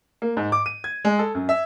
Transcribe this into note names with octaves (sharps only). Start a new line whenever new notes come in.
A#3
G#2
D6
D#7
G#6
G#3
A4
F#2
E5